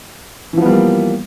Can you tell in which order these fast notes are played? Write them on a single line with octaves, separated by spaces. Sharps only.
E3 F3 B3 G3 A#3